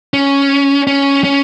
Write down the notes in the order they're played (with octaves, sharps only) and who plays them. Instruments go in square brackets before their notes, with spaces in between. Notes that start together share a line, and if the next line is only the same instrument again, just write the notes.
[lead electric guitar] C#4
C#4
C#4